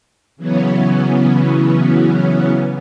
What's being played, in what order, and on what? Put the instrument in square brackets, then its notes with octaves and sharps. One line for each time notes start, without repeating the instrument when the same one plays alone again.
[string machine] C#3 E3 F#3 B3 C#4